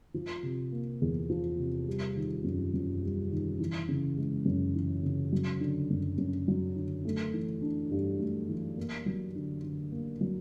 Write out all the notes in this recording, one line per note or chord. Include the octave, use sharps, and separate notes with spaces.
F3
C3
A#3
E2
F3
C3
G3
D#3
F#2
F#2
G3
D#3
E3
C#3
G#3
F#2
E3
C#3
F#3
D3
F#2
F#2
F#3
D3
A3
E3
D4
G2
A3
E3
A#3
F#3
D3
D3
A#3
F#3